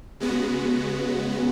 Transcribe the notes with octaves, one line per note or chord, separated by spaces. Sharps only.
C#3 G#3 B3 F#4